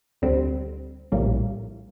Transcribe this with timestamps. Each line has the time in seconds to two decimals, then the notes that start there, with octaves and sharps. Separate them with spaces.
0.22 D2 D3 G3 C4
1.12 A#1 A2 G3 A#3